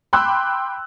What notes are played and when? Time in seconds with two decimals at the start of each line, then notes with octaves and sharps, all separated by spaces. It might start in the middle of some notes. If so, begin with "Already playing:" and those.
0.13 G5 B5 C6 D6 E6 F#6